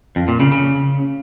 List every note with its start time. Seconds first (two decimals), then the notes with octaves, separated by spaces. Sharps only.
0.16 F2
0.28 A#2
0.40 C#3
0.52 C#3